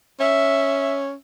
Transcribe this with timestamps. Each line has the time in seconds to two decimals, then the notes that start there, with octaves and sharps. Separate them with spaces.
0.20 C#4 E5